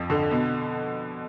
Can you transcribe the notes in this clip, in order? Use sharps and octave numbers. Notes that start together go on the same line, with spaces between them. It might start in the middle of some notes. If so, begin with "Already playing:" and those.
Already playing: F2 F3
D3
B2